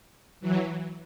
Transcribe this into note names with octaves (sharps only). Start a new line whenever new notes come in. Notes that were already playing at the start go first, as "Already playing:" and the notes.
E3 F#3